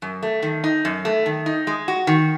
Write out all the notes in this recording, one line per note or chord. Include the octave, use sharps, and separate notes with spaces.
F#2
A3
D#3
D#4
F#2
A3
D#3
D#4
G#3
F#4
D#3